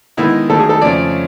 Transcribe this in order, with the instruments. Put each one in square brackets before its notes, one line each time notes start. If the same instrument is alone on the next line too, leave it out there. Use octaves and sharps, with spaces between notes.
[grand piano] D#3 G#3 B3 D#4 [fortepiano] E4
[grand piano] D#3 F#3 A3 [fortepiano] A4
[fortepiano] G#4
A4
[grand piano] F2 C#3 F3 A3 C#4 [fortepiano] D5